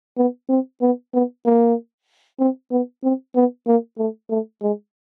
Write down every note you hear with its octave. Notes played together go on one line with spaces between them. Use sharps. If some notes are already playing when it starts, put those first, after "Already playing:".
B3
C4
B3
B3
A#3
C4
B3
C4
B3
A#3
A3
A3
G#3